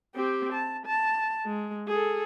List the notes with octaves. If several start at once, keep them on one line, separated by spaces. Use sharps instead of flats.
C4 G4
A5
A5
G#3
G#4 A4